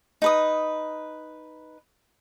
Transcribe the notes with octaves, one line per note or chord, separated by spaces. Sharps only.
D#4 B4 D#6